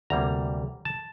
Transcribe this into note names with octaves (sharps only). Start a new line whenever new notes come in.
D2 C3 G3 A#3 A#5
A5